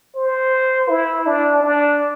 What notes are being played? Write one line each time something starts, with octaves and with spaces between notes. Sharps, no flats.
C5
E4
D4
D4